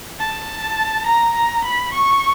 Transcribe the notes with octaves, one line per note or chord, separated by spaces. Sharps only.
A5
A#5
A#5
B5
C#6